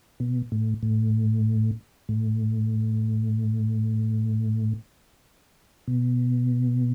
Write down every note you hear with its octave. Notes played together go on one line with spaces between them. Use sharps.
B2
A2
A2
A2
B2